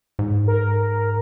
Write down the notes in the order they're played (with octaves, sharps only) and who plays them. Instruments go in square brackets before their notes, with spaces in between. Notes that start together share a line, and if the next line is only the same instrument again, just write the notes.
[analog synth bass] G#2
[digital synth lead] A#4